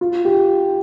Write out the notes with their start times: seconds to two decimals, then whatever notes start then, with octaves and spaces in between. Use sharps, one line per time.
0.01 F4
0.25 G4